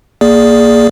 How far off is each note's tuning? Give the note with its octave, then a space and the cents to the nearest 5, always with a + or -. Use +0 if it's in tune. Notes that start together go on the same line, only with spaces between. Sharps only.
A#3 +0 G#4 +5 D5 +0